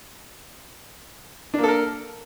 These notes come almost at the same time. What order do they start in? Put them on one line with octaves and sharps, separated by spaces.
D4 A#3 A4 A#4